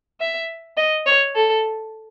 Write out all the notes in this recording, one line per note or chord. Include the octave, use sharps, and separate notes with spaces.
E5
D#5
C#5
A4